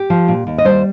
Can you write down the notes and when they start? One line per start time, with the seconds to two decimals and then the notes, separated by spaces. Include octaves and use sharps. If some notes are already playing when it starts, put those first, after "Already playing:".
Already playing: G4
0.10 F3
0.28 A#2
0.47 D#2
0.58 D#5
0.65 G3 C5